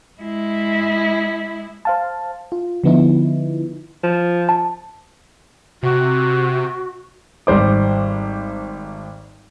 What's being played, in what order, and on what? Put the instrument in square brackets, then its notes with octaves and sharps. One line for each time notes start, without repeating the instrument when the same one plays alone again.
[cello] G#3 E4
[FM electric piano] C5 F5 A5
F4
D3 F3 B3 D#4 E4
[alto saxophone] F3
[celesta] A5
[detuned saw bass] C3 [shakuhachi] F#4
[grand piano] G#1 G3 C5 D6